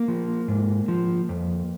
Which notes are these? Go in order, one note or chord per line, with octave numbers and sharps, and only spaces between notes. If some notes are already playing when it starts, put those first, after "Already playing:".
Already playing: A#3
F3
G#2
F3
F2